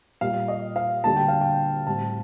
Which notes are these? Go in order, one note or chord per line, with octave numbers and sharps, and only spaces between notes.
A#2 G3 A#3 F5
D#5
F5
D2 D3 G3 A#3 A5
G5
F5
G5
A2 G3 C4 A5